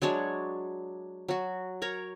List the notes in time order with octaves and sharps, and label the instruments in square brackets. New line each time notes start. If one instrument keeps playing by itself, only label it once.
[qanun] F#3 G#3 D4 C#5
F#3 F#4
A#4 C#5 A#5